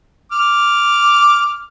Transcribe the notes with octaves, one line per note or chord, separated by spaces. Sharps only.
D6 F6